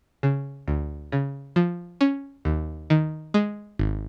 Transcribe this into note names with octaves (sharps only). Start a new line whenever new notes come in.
C#3
D2
C#3
F3
C#4
D#2
D#3
G#3
G#1